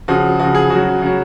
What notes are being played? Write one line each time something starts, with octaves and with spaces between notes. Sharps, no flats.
C#3 F3 F#4
C#3 F3 F#4
G#4
C#3 F#3 F#4
C#3 F#3